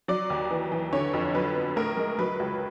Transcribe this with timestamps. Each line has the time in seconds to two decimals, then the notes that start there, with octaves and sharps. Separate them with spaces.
0.08 F#3 D5
0.30 D#2
0.51 E3
0.72 E3
0.92 D3 C#5
1.13 F2
1.35 F#3 B4
1.56 B3
1.76 A2 A#4
1.97 G#3
2.19 F#3 B4
2.40 C#2